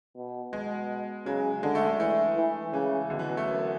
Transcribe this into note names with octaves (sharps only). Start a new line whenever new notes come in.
B2
B2 G#3
C#3 F#3
D3 G#3
A3
A3
E3 A3
E3
C#3 E3
B2 D3
E3
F#3
A3
F#2 B3